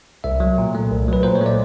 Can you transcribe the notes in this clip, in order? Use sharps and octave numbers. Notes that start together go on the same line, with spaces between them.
C2 E5
F#3
A#2
A3
C2
F#3 B4
A#2 C5
C#5
A3 D5